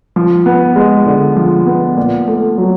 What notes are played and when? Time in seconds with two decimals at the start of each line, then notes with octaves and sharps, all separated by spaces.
0.16 F3
0.46 B3
0.76 G#3
1.06 D3
1.36 F3
1.67 B3
1.96 A#2
2.27 A3
2.58 F#3